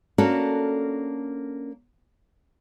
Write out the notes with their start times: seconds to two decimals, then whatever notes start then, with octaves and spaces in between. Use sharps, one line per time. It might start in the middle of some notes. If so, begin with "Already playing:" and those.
0.18 A#3 C#4 D4 F#4 A4